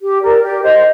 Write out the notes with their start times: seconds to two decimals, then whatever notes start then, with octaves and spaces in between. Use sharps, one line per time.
0.01 G4
0.22 A#4 D5
0.42 G4
0.63 C5 D#5